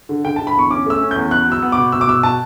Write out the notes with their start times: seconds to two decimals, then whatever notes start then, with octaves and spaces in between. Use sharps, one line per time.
0.09 D3
0.25 D3 G5
0.36 D3 A5
0.47 B5
0.55 E2 C#6
0.70 C#4 D6
0.86 A3 E6
1.01 C#4
1.11 E2 G6
1.31 B3 F#6
1.47 F#3 E6
1.62 B3
1.72 D6
1.78 B2
1.92 B2 E6
2.01 D6
2.07 B2 E6
2.23 B2 A5